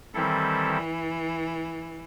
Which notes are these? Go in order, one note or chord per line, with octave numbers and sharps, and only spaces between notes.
D#3 E3 G3 C4 E4 A4